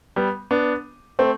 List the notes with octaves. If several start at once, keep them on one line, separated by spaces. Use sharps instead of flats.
G3 B3
B3 D4
A3 C4